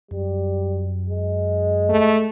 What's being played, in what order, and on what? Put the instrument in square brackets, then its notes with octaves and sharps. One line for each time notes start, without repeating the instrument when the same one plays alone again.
[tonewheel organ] F#2 [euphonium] G3
[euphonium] G#3
[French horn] A3